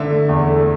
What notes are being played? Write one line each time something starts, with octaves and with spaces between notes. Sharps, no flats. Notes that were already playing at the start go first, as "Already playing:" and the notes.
Already playing: D3 A3 E5
A3
E2
A3